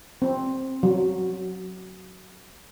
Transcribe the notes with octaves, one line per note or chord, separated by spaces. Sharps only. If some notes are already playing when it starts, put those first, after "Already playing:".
C4
F#3